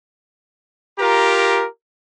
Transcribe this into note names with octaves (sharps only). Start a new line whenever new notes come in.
F4 G4 A#4 A#5